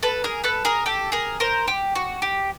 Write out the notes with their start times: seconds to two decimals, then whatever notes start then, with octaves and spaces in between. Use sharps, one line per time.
0.03 A4 B4
0.24 G#4 A#4
0.44 A4 B4
0.65 G#4 A#4
0.86 G4 A4
1.12 G#4 A#4
1.40 A#4 C5
1.68 G4
1.95 F#4
2.22 G4